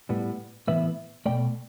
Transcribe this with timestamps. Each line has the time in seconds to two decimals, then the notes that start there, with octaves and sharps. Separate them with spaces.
0.09 A2 G3 B3
0.67 A2 E3 B3 B4 E5
1.26 B2 A3 D5 G5